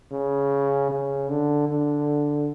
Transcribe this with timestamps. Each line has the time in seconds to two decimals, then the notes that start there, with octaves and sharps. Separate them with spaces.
0.12 C#3
0.90 C#3
1.30 D3
1.68 D3